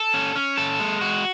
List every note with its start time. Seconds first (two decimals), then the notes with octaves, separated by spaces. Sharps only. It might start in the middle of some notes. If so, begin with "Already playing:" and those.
Already playing: A4
0.14 C#4
0.35 C#4
0.57 A4
0.80 G#3
1.01 F#4